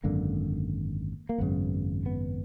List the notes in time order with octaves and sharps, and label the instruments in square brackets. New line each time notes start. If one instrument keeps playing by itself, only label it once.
[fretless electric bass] G#1 F#2 D3 A#3
A#3
G#1 F#2 C#3 B3
B3